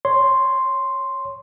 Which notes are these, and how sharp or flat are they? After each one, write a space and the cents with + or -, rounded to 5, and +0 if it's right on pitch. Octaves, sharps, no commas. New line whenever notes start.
C#5 +0 C6 +0